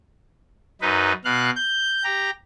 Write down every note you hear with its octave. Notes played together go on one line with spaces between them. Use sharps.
F#2 D#4 B4
B2 F5 F#6
G6
G4 A#5